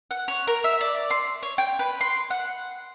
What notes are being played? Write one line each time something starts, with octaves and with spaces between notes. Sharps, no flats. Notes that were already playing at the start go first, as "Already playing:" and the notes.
F#5
C#5
A#4
E5
D5
C6
C#5
G5
B4
C6
F#5